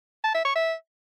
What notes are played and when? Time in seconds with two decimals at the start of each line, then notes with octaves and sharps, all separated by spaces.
0.24 A5
0.34 E5
0.45 C#6
0.55 E5